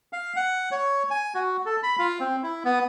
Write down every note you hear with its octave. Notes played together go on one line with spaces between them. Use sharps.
F5
F#5
C#5
G#5
F#4
A4
B5
F4
C4
E4
B3